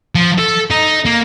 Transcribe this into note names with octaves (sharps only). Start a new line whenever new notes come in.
F3
A4
D#4
A#3